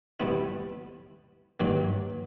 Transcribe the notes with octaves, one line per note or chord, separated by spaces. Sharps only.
B2 G3 B3 E4
G2 D#3 F#3 A#3